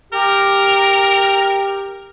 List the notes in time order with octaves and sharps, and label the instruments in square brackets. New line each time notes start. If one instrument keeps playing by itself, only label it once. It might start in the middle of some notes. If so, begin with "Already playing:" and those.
[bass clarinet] G4 [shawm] A#4